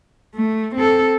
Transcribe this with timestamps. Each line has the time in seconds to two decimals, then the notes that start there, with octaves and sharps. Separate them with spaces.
0.35 A3
0.75 C4 A4